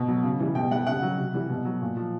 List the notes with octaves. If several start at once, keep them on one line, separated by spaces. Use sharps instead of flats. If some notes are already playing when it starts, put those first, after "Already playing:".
Already playing: B2
F#3
C#3
E3 G3
B2 G5
G3 F#5
C#3 F#5
F#3
C3
E3 G3
B2
F#3
A#2
F3